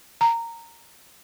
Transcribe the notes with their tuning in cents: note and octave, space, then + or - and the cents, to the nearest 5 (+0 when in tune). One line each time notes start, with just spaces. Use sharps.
A#5 -15